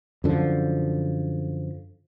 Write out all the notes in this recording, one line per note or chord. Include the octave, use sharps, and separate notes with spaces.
F#2 D3 F3